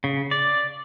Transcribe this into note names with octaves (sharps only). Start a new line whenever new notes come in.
C#3
D5